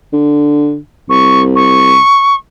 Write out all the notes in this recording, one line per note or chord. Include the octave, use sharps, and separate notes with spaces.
D3
C2 C#6
C#6